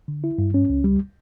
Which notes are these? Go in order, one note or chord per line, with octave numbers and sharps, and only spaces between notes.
D3
E4
G2
C#4
C#2
G3